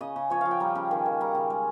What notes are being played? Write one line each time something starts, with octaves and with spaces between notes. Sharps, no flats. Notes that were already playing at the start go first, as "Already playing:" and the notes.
C#3 D#5
C#3
F3 C#5
F3 F5
G5
G3 A#5
C#3
D#3
D#3
G3 A#5
C#3
G#3